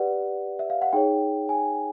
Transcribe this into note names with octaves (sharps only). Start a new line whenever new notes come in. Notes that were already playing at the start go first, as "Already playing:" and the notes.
Already playing: G4 B4 D5 F#5
E5
F5
F#5
D#4 G#4 C#5 G5
G#5